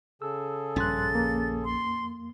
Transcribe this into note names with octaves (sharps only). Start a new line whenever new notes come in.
C#3 G#4 A4 E6
A#1 G2 C#4 C6 F#6 A6
F2 A#3
C6